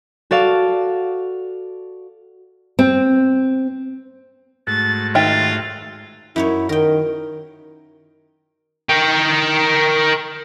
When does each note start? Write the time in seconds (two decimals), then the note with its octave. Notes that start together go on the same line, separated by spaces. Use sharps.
0.31 F#4 A4 D5 F5
2.79 C4
4.67 G#2 A3 F#4 A6
5.15 D#3 F4 E5 G5 A6
6.36 F#2 D#4 E4 C#5
6.69 D#3 A#4 G5
8.89 A#4 G5